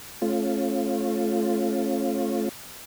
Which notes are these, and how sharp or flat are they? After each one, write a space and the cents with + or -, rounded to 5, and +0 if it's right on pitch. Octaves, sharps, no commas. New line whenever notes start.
A3 -20 C#4 -30 F4 +0